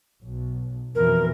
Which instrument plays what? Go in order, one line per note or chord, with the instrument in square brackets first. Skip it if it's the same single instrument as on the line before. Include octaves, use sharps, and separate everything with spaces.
[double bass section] B1
[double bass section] F2 B2 E3 [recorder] A#4